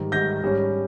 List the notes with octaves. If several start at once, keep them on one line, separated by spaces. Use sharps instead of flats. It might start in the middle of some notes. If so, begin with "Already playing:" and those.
Already playing: G#2 D#3 G3
G#2 D#3 G3 G6 A#6
G#2 G3 C#4